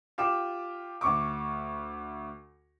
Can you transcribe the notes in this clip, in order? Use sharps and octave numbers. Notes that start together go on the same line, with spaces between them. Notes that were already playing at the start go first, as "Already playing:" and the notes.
F4 G4 D6 E7
D2 C#6 D6